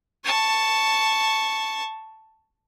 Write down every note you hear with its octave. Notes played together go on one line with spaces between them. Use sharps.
A5 C#6